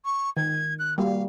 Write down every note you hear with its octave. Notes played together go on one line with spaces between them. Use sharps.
C#6
D#3 G#6
F#6
G3 A#3 F#4 F5